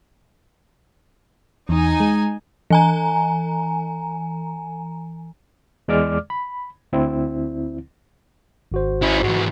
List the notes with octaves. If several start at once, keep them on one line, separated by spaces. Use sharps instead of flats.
E2 D#4 G#5
G#3
E3 G#5 A#5
E2 G#3 D5 D6 F6
B5
D2 C4 E4
G#1 F#4 C5
C#4 E4
G#2 E3 F#4